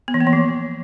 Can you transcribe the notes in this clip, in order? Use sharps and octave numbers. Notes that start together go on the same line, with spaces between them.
B3
E3
A#3
E3
F3